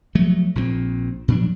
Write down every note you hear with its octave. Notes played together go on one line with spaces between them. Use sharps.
F3 F#3 A3
A#1 A#2 D#3 C4
A#2 F3 F#3 D4